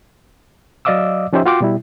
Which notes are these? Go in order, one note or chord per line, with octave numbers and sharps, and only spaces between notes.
F#3 D5 D#5 F5 D6 E6
F3 C#4 D#4 G4 C5 E5
F4 F#4 F5 G5 C6 D6
B2 G3 E4